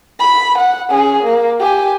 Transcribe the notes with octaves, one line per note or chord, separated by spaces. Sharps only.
B5
F#5
C#4 G#4
A#3
G4 G#5